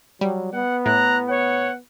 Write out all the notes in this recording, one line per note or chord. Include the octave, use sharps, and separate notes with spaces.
F#3 G3
B3 F#5
A2 A#5 F#6
C#5 F#5